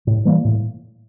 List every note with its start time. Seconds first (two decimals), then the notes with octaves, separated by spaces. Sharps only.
0.07 A2
0.25 E3 G3 A#3
0.45 A2